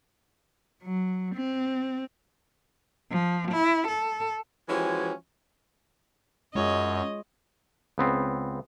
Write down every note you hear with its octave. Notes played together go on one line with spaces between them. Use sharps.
F#3
C4
F3
E4
A4
E3 F3 G#3 C#4 F#4 G4
F#2 G#3 F4 C#5 D#5
C#2 B3 C4